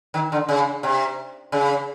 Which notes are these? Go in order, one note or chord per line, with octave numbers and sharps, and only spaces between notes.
D#3
D3
C#3
C3
C#3